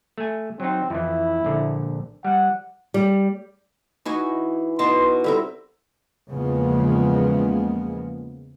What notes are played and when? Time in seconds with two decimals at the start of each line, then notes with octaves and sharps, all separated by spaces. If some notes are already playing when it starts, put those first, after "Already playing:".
0.18 A3 G#5
0.60 F#3 C4 D#4
0.90 F2 E3 E4
1.45 A#1 D3
2.25 G3 F#5
2.94 G3
4.05 E3 D#4 F#4 G#5
4.79 B2 D#4 A5 C6
5.24 G3 C4 E4 A4 A#4 E5
6.30 E2 C#3 F3 G#3 A#3 B3